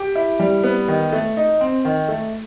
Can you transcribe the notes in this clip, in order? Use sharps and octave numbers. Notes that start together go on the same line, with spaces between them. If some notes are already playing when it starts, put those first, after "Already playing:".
Already playing: G4
E4
G3
B3
D#3
A3
D#4
C4
D#3
A3